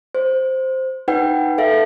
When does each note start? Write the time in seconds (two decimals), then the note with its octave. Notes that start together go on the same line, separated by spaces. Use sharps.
0.15 C5
1.08 D#4 B4 F#5 G5
1.58 A4 E5 F5